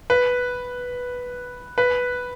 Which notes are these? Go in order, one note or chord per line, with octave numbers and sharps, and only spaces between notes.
B4
B4